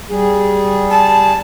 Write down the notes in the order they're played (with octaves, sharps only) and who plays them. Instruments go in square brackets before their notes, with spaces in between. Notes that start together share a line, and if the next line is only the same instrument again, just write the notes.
[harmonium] G3 G#4
[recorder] A5